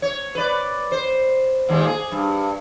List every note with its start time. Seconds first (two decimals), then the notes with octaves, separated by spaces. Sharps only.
0.02 C#5
0.35 B4 D5
0.92 C5
1.69 D#2 A#2 G#3
1.87 G#4
2.11 G2